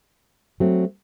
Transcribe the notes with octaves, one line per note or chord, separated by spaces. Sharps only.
F#3 A3 C4